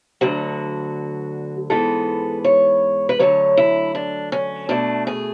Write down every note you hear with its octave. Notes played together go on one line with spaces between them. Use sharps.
D2 D3 F#3 F#4
G#2 E3 G#3 B3 A4
C#5
B4
D2 D3 F#3 C#5
E4
D4
C#4
B2 A3 D4
G#4